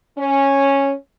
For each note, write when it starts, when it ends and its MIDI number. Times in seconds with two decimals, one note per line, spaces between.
0.18 0.93 61